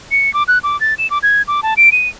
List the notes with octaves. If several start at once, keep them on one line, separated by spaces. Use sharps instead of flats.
C#7
D6
F#6
D6
A6
E7
D6
G#6
D6
A5
D7
D#7